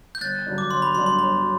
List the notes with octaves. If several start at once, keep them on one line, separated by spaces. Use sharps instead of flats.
G6
G1 F#6 A6
G2 D3 F#3
D6
G1 C6
B5
G2 D3 F#3 C6
C6
G1 B5
F#3